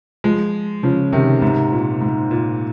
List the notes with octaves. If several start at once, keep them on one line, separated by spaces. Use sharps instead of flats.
F3 G#3
C#3 F3
C3 D#3
G#2 C3
A#2
G#2
A#2